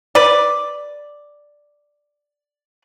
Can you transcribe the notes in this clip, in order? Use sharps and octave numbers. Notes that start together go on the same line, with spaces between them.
B4 D5